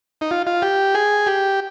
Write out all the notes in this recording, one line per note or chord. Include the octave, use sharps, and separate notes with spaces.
D#4
F4
F4
G4
G#4
G4